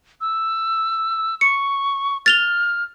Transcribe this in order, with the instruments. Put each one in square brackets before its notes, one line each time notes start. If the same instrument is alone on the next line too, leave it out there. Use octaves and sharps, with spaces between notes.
[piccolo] E6
[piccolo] C#6 [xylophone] C#7
[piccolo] F6 [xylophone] A6 F7 G7